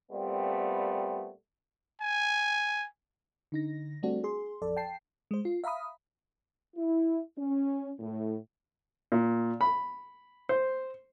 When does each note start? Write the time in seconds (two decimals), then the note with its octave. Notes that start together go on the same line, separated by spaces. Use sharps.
0.11 A#2 G3 A3 B3 C4
2.01 G#5
3.52 D3 D#4 A#6
4.03 G3 A3 C4 D4 F#4
4.24 G#4 C6
4.62 A1 F2 A4 D5
4.76 G5 A5 C7
5.31 G#3 C5
5.45 F4
5.64 E5 F5 A#5 B5 D#6
6.76 E4
7.37 C#4
7.99 A2
9.12 A#2
9.61 B5
10.49 C5